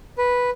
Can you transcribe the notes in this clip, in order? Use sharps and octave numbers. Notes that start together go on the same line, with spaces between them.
B4